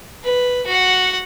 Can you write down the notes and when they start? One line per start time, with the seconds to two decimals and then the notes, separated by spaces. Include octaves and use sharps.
0.24 B4
0.67 F#4 F#5